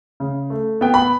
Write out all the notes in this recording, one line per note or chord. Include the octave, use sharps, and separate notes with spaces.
C#3
A3
B3 G5
B5